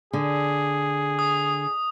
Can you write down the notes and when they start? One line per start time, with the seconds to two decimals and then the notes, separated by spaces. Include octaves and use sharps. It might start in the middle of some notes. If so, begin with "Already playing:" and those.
0.13 D3 G#4
1.19 D#6